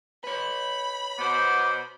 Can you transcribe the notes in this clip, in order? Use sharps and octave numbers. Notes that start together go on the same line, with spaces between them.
B4 C#5 B5
B2 B3 C5 D6